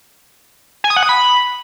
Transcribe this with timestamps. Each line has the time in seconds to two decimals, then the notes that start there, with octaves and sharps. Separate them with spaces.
0.84 G#5
0.90 D#6
0.97 F#5
1.03 D#6
1.09 B5